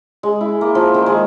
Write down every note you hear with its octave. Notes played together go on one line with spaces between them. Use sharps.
G#3
E4
A#3
F3
D#3
G#3